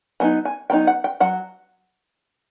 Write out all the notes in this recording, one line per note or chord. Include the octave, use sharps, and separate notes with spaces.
F#3 B3 D#4 G#5
G#5
F#3 B3 D#4 G5
F#5
G5
F#3 F#5